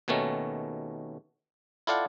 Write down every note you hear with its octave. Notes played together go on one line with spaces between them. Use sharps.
D#2 B2 D#3 A3 C#4
E4 F4 A4 D5 F5 F#5